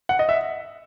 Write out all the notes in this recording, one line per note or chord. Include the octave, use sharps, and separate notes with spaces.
F#5
D#5
E5